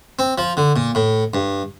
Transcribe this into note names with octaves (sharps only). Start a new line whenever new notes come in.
C4
F3
D3
A#2
A2
G2